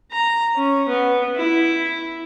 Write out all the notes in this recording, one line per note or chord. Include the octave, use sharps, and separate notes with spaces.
A#5
C#4
B3
E4